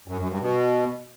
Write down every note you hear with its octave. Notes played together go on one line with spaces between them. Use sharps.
F#2
F#2
G2
B2